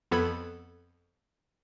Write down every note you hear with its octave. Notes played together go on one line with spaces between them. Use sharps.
F2 B3 A4 B5 G#6